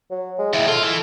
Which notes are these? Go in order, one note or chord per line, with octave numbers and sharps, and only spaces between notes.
F#3
G#3
D#2 B2 E4
F4 A4
E3